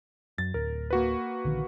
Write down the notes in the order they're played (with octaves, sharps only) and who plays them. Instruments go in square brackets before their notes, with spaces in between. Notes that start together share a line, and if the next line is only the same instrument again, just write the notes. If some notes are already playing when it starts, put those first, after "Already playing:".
[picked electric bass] F#2 [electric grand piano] A6
[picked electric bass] D1 [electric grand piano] A#4
[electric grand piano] A#3 F#4 B4
[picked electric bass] A#1 D3 D#3